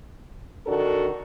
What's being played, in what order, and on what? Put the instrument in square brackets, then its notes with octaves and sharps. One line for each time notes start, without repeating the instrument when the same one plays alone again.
[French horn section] D#3 D4 F#4 A4 A#4